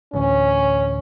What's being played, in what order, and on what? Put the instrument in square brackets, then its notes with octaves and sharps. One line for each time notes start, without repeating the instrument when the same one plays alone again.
[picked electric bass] A1 D2 [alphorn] C#4